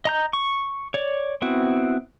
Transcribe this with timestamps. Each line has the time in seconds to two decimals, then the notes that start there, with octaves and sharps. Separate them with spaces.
0.05 D#5 A#5 G6
0.33 C#6
0.94 C#5 D5
1.42 B3 C4 E4 F#4